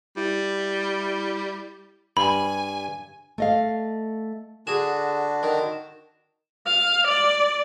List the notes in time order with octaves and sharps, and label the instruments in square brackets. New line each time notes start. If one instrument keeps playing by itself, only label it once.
[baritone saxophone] G3 [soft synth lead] E4
[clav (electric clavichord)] G2 [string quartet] G#5 [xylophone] B5
[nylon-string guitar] A3 D#5 F5
[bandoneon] D3 D4 F#4 [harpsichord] G#4 [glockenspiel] E7
[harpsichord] D#3
[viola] F5
D5